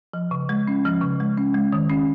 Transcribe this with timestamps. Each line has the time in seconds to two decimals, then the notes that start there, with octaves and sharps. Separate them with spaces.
0.14 F3
0.31 C#3
0.49 G#3
0.67 C#4
0.85 F3
1.01 C#3
1.20 G#3
1.38 C#4
1.54 G#3
1.73 D#3
1.89 C#4